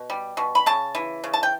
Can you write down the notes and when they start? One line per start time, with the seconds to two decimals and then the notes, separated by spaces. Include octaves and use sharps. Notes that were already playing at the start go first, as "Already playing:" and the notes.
Already playing: B2
0.10 G3
0.37 B2
0.55 B5
0.66 C#3 A5
0.95 E3
1.24 C#3
1.33 A5
1.43 G5